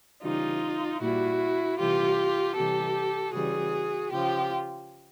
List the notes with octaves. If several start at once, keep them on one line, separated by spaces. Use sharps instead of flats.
C#3 E3 G3 D#4 F4
A#2 G3 E4 F#4
C3 E3 G3 F4 G4
C3 E3 G3 G4 A4
C#3 E3 G3 F#4 G#4
C#3 F3 F4 G4